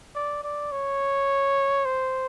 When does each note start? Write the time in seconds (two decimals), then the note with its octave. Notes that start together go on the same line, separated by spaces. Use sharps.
0.15 D5
0.43 D5
0.72 C#5
1.85 C5